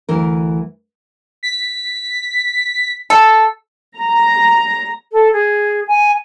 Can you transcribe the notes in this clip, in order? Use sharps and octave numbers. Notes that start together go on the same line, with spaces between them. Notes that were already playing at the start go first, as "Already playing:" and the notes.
D2 E3 A#4
B6
A4
A#5
A4
G#4
G#5